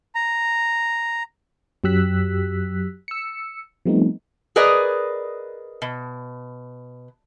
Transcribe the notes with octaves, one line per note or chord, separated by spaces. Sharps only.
A#5
F#2 F#3 G4 E6 F#6 B6
E6 C#7
F3 G3 A3 B3 C4 D#4
G#4 A#4 B4 D5 D#5
B2